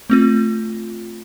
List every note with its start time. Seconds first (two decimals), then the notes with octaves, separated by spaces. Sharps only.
0.10 A3 C4 F4